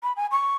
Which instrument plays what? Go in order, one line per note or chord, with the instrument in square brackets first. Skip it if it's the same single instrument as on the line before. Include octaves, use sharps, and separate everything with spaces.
[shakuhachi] B5
G#5
C#6